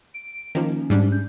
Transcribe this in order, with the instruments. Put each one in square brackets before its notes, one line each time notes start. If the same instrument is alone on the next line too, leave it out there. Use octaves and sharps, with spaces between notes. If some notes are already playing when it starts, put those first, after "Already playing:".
[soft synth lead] D7
[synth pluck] D#3 F3 A#3 [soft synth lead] C#4
[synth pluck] G#2 G3 D4
[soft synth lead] G6